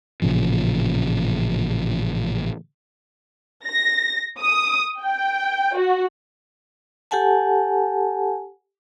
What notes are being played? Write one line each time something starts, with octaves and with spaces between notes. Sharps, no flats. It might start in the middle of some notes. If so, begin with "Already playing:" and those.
A1 A#2 C#3 F3
A#6
D#6
G5
F#4
G4 A4 F#5 G#5 A5